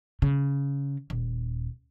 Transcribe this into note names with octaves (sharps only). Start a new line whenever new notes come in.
C#3
D#1